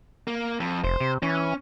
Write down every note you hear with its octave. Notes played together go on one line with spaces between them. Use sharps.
A#3
F2
F1 C5
C3
E3 C#4